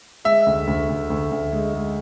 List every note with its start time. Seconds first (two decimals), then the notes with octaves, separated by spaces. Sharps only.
0.25 G#3 E5
0.46 D2
0.67 D2
0.89 D2
1.10 D2
1.31 D2
1.52 G#3
1.74 G#3